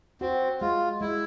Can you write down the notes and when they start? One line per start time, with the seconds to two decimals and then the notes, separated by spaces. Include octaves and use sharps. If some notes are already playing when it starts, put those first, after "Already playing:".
0.21 C4 F#4
0.61 G#3 F4
1.01 G#3 E4